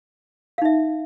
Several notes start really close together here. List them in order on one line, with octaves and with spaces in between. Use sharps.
F5 D#4 E5